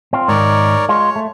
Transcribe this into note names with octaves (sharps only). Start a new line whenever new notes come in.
C4 F4
G#2 D#3 A#4 C#5 D5
G#3 F4 C#5
A3